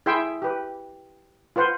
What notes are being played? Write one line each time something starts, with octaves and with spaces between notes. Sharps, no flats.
E4 G#4 E5 G5 C6
G4 B4
F4 B4 C5 F#5